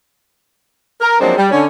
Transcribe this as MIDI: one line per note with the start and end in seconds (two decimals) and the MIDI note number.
1.01 1.17 70
1.20 1.35 53
1.20 1.35 54
1.20 1.35 56
1.20 1.35 58
1.20 1.35 60
1.20 1.35 62
1.37 1.48 55
1.51 1.66 50
1.51 1.66 61